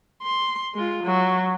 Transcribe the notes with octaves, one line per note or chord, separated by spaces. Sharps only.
C6
G#3 F4
F#3